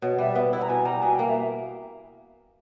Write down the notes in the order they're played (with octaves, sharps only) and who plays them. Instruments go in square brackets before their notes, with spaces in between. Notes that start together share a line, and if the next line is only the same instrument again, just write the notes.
[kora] B2 [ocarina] C#5
[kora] G3 [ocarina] E5
[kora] B3 [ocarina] B4
[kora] E4 [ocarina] B4
[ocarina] A#5
[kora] B2 [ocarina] G#5
[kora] G3 [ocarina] A#5
[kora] B2 [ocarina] G#5
[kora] A#3 [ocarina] G5
[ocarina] E5